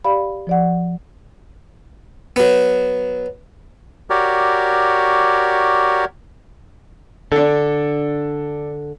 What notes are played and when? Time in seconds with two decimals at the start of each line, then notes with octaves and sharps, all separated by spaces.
0.05 G4 D5 F5 B5
0.47 F3 D5 F#5
2.36 F#3 B3
4.10 F#4 G4 A#4 C#5 D5
7.32 D3 D4 A4